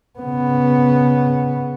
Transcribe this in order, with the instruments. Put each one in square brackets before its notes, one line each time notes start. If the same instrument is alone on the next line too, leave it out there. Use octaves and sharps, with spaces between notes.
[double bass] C#3 B3